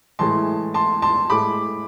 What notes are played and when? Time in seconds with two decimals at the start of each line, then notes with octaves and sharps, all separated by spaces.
0.19 A2 E3 G#3 A5 C6
0.74 A5 C6
1.02 A5 C6
1.30 A2 G#3 B5 D6